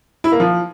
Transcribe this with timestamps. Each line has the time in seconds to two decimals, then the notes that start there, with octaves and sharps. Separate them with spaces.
0.24 E4
0.32 A#3
0.40 F3